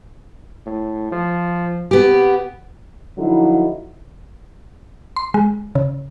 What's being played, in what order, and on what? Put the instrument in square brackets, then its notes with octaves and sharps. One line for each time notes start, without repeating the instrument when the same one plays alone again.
[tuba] A2
F3
[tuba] C3 [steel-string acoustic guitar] B3 G4
[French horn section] D3 F3 F#3 D#4 E4
[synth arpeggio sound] C6
G#3
C#3